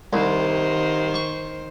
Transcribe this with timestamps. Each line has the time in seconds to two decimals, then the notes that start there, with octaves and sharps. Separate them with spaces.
0.13 C2 D#3 C5
1.14 C#6